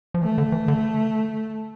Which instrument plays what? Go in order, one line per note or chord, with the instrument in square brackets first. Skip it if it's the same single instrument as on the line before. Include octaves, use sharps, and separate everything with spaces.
[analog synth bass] F3
[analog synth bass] E3 [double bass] A3
[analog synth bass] D3
E3
D3